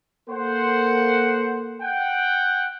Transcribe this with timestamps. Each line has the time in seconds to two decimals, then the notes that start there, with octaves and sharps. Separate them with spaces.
0.29 A#3 A4 C5 F#5
1.82 F#5 G5